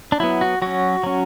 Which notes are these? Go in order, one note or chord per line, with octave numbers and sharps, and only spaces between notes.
D4
F#3 B3 E4
F#4
F#3 C#4 F#4
F#3 C#4